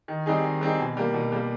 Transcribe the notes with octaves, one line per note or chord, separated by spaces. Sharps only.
D#3
G3 C4 D#4 G#4
D#3
G3 C4 D#4 G#4
B2
G3 A#3
B2
G3 A#3